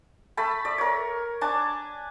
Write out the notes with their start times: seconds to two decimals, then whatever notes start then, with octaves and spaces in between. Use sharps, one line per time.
0.37 A3 A5 B5
0.65 D5
0.78 A#4 C#5
1.41 D4 G#5 A5 D6